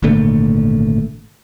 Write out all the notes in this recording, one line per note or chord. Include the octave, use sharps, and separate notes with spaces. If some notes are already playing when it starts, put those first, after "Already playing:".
G#1 A#2 D3 A3